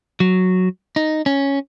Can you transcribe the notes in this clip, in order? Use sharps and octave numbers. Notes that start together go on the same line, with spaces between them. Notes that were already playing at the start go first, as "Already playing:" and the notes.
F#3
D#4
C#4